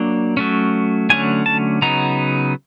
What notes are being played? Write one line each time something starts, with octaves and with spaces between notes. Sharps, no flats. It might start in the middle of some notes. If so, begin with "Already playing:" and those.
Already playing: F#3 A#3 D4
F#3 A3 C#4
D3 F#3 A3 C#4 G#5
A5
C#3 F#3 B3 D#4 A#5